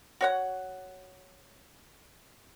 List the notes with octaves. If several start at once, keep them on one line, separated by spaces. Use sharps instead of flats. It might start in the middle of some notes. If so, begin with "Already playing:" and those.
F#4 C#5 F#5